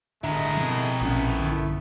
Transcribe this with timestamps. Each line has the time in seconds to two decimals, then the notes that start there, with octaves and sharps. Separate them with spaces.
0.24 G1 A2 G#3 A3 D4 E4 A#4 D#5
0.57 B2 F3 C4
1.01 A#1 A#2 A3 B3 C#4
1.39 G1 D3